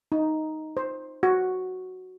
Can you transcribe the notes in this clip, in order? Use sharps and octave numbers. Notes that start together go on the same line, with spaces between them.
D#4
C5
F#4